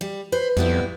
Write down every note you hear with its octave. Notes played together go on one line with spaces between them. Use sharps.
G3
B4 C5
F2 G3 B3 E4